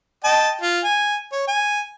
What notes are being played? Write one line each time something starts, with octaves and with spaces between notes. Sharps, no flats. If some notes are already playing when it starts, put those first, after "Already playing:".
D#5 G5 A5
F4
G#5
C#5
G#5